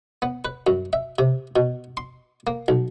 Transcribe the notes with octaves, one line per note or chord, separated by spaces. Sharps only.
B3
B4
F#2
E5
C3
B2
C6
A#3
B1